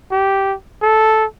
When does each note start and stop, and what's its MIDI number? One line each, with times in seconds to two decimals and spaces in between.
0.11 0.54 67
0.82 1.25 69